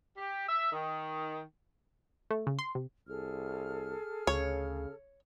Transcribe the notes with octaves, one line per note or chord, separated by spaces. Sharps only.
G4
E5
D#3
A3
C#3
C6
C3
C2 G#4 A4 F6
D2 C#3 C#5